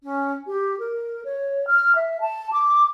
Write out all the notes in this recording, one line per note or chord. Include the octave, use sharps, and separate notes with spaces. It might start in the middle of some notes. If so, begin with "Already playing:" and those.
C#4
G4
A#4
C#5
F6
E5
A5
D6